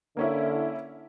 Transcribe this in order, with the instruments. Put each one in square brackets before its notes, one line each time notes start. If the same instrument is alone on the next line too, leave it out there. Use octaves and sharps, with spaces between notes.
[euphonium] D3 [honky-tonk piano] A#3 C#4 E4